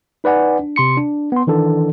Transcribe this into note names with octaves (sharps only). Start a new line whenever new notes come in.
D#4 B4 D5 F#5 G#5
D4
C3 C6 C#7
D4
B3 C6
D#3 E3 D4 A4